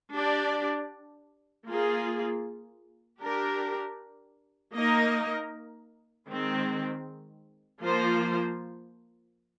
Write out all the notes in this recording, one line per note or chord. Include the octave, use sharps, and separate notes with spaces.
D4 G4 D5
A#3 F4 G#4
D4 G4 A#4
A#3 D#4 A#4 D#5
D#3 G#3 C4
F3 A#3 F4 C5